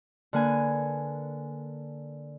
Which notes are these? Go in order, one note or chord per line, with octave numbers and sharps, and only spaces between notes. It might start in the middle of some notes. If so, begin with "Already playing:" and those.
D3 A#3 B4 G#5